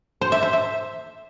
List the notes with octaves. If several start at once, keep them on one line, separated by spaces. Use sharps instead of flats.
C5
E5
C5
E5